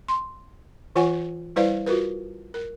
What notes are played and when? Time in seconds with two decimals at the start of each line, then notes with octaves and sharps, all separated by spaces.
0.08 C6
0.96 E3 F4 C#5 F#5 G#5
1.56 G3 E4 B4 C5 D5 F5
1.86 F4 F#4 A#4 B4
2.54 A#4